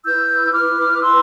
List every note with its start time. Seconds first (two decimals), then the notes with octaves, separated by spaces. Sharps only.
0.05 E4 B4 E6 G6
0.52 D6 F6
1.01 C6 E6